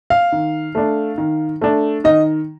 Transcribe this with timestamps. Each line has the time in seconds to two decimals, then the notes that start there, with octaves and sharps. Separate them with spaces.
0.10 F5
0.32 D#3
0.75 A3 D4
1.18 D#3
1.62 A3 D4
2.04 D#3 D#5